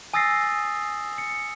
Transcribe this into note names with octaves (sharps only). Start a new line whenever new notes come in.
G#5 D#6 E6 A6 A#6 C7
C#7